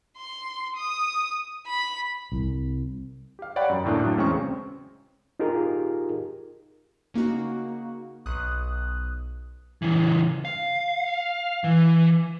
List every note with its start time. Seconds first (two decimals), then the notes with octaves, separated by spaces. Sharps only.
0.18 C6
0.76 D#6
1.67 B5
2.32 C2
3.39 G4 F5
3.56 C#5 D5 F#5 G5 B5
3.69 F#2
3.85 D2 A2 A3 A#3 D4
3.99 A2 F#3
4.17 E2 C#3 G#3 C4 C#4 C#6
5.40 D#4 F4 G4 G#4 A#4
7.14 C#3 A#3 D#4 F#4
8.26 B1 D#6 F#6
9.82 C#3 E3
10.45 F5
11.64 E3